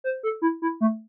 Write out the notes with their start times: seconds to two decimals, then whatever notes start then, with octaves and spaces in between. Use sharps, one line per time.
0.04 C5
0.23 A4
0.42 E4
0.62 E4
0.81 A3